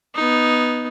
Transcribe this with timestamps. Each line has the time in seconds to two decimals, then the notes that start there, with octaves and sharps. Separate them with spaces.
0.15 B3 D#4